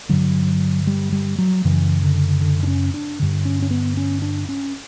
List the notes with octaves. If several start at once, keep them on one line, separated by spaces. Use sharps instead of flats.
G2 D3 F#3
G3
G3
F#3
F#2 C#3 E3
D3
D3
D4
C#4
D4
G2 D3
C#4
C#4
B3
C#4
D4
C#4